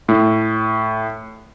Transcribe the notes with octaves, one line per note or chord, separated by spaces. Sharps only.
A2